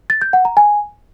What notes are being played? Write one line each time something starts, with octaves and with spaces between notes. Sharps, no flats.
A6
G6
F#5
A#5
G#5